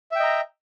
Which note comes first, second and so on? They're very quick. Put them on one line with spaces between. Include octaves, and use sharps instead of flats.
E5 G5 D#5 A#5